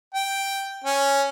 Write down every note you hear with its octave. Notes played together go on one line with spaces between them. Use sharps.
G5
C#4